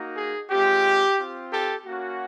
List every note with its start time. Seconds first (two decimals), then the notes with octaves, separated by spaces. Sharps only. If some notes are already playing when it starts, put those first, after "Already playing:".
Already playing: A#3 D#4 F#4
0.16 G#4
0.50 G#3 C4 F4 G4
1.18 C4 F4
1.52 G4 A4
1.85 A#3 C#4 F#4